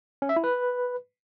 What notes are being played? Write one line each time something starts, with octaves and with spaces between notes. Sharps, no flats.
C#4
E5
E4
B4